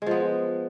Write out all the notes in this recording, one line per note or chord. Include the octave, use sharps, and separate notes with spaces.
F3 G#3 B3